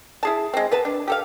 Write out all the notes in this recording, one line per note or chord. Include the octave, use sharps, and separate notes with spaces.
E4 G#4 A5
G#3 C4
B3 B4 A5
D4
G4 A4 F5